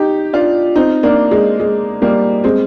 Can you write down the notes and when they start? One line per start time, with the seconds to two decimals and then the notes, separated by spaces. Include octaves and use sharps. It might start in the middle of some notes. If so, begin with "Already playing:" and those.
Already playing: D#4 G4
0.33 D4 F4
0.76 C4 D#4
1.03 A#3 D4
1.31 G#3
1.60 G#3
2.02 G3 A#3
2.44 G#3 C4